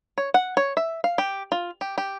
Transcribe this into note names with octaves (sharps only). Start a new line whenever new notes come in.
C#5
F#5
C#5
E5
F5
G4
F4
G4
G4